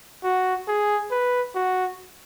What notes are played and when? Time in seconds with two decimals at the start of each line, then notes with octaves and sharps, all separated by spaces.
0.24 F#4
0.68 G#4
1.11 B4
1.55 F#4